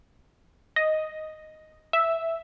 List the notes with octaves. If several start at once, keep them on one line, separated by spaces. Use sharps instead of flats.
D#5
E5